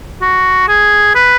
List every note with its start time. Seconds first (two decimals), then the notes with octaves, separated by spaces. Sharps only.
0.21 F#4
0.68 G#4
1.15 B4